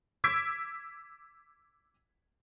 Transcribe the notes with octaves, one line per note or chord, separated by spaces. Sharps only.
D6 E6 G#6 B6 D7